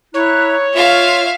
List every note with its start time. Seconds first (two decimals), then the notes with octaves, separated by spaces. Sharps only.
0.14 E4 C#5 A#5 F#6
0.74 F4 E5 F5